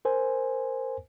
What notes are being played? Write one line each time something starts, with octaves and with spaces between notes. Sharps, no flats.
A#4 C5 G#5